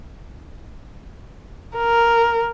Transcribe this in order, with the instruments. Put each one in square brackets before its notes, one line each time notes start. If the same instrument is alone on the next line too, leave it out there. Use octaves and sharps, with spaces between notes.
[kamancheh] A#4